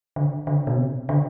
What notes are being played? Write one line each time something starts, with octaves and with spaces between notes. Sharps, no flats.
D3
D3
B2
C3
D3